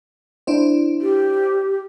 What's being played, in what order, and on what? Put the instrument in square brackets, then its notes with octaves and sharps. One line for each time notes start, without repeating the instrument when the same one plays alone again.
[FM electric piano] D4 E4 C5
[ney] G4